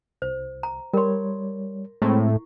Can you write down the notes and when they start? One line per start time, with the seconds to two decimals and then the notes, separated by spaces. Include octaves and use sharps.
0.22 C2 C5
0.63 A#5
0.94 G3 A#4 C#5 C6
2.02 A2 G#3 C4 E4 C#6